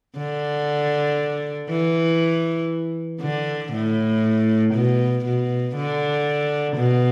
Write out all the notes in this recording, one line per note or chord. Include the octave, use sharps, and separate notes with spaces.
D3
E3
D3
A2
B2
B2
D3
B2